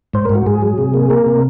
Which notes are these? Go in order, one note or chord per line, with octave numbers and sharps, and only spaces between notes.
G#2 C5
G#2 A#4
F#4
G#2 G#4
F#3
C3
A#3
A#3 A#4
C3